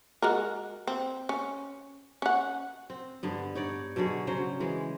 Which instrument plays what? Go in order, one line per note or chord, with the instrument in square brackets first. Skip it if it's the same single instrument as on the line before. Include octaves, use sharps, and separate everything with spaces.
[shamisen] G#3 F#4 A#4
C4
C#4
C#4 F#5
[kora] C4
G2 D3 B3
D#4 C#5 D5
B2 D3 F#3 G#4
C#3 F#3 C5
E3 G#3